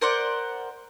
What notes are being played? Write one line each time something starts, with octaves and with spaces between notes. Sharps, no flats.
A#4 C5 D5 F#5